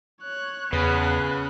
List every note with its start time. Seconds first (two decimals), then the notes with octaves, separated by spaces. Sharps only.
0.23 C#5 F#6
0.73 E2 C#3 B3 F#6